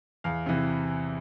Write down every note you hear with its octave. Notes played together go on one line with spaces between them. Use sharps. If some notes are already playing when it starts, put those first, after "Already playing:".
E2 F5
C3 E3